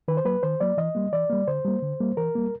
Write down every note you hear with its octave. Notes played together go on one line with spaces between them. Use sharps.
D#3 B4
C5
F#3 A#3 B4
D#3 C5
F#3 A#3 D5
E3 D#5
G3 A#3
E3 D5
G3 A#3
D3 C5
G3 A#3
D3
G3 A#3
E3 A#4
G3 A#3